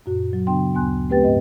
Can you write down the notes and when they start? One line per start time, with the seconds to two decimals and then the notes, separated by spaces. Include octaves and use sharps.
0.06 F#2 A#2 F#4
0.33 F#3
0.47 C#3 B3 D4 G5 C6
0.74 D2 B3 G#5 C6 F#6
1.10 A3 C4 G4 B4 G5 A6
1.24 G#2 G4 D#5